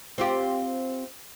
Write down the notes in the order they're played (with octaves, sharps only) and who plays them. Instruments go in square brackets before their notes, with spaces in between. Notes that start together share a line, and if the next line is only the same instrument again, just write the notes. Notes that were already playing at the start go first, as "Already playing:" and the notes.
[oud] C4 F4 G4